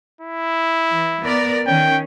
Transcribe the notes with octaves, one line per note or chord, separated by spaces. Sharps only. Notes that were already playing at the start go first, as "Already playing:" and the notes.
E4
E3
B3 A#4 D5
D#3 C#4 G5